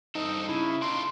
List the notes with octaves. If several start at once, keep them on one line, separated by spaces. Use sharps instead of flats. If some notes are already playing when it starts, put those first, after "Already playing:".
G2 C4 D#4 A4
C#3 E4
D4 D#4 F4 C6